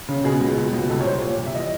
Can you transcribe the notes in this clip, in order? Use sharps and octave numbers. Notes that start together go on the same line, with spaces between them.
C#3
B2 G#4
C#2
B2
C#2
C2 A4
C#5
C2 C5
A#2 C#5
C2
E5
E3 D#5